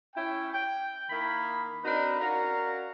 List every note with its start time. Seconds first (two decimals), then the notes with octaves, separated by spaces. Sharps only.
0.16 C#4 E4 G5
0.53 G5
1.10 D#3 A#3 E4 B5
1.84 C4 D4 D#4 F#4 A#4 B4
2.20 C#4 F#4 A#4 D5 F5 A#5